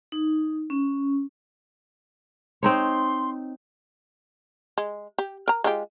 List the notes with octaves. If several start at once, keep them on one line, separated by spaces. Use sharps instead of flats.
D#4
C#4
C4 D#4 C#5 C6
G#3
G4
A#4 A#5
G#3 F4 G4